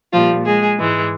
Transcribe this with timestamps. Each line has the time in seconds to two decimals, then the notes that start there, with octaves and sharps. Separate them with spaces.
0.12 A#2 F3 G3 F4
0.45 G#3 G#4
0.78 G#2 E3 G#3